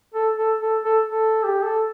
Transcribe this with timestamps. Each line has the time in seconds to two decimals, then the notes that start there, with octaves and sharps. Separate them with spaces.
0.14 A4
0.38 A4
0.61 A4
0.85 A4
1.09 A4
1.44 G4
1.63 A4